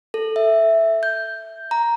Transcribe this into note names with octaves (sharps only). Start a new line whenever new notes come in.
A4
E5
G6
A#5